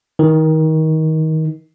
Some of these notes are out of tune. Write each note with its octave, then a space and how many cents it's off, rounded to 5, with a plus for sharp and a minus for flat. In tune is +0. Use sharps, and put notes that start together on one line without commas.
D#3 +25